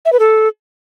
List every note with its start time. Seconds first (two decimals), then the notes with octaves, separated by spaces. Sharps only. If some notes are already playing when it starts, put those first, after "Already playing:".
0.05 E5
0.12 B4
0.19 A4